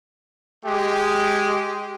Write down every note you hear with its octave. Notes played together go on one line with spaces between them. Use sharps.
G#3 G4